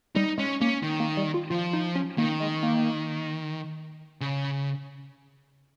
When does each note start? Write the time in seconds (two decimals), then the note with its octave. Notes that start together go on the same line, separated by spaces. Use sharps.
0.16 G3 D#4
0.38 G#3 C#4
0.61 A#3 C#4
0.83 D#3
1.00 A#3
1.17 G3
1.34 F4
1.50 F3 F4
1.73 D#4
1.95 C#4
2.18 D#3 A#3
2.40 G#3
2.63 A#3
4.21 C#3